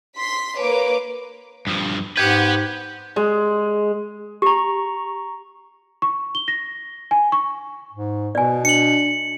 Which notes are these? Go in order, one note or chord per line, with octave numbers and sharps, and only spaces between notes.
C6 B6
A#3 B4 C#5 D6
G2 F3
G#2 G4 B4 F#5 G6 G#6 B6
G#3
G4 A#5 C#6
C#6
G7
A#6
G#5
C#6
G#2
B2 B3 D5 G#5
D4 C#7 F#7